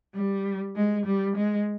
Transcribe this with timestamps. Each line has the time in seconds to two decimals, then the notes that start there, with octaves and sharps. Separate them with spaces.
0.15 G3
0.76 G#3
1.06 G3
1.36 G#3